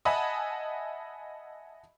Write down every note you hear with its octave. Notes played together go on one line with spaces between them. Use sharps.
D#5 E5 F#5 G#5 A5 B5